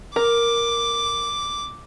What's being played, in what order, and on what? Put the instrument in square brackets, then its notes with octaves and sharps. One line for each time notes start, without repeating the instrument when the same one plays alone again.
[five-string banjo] A#4 [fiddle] D6